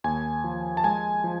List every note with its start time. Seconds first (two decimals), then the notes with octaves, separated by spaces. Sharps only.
0.04 D#2 G#5
0.44 F3
0.77 A5
0.84 G#3 G#5
1.24 F3